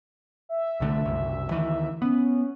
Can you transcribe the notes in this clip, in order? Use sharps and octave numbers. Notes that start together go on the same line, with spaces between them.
E5
C2 D3 A3
F#1 C2
D2 D#3 E3
B3 C#4